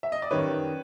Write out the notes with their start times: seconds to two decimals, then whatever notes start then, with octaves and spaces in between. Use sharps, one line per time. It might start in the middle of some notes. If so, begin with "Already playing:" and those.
0.03 E5
0.12 D#5
0.22 D5
0.31 F#2 D#3 G3 B4 C#5